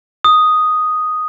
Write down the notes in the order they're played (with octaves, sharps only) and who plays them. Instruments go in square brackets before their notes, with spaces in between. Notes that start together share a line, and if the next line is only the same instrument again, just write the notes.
[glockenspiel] D#6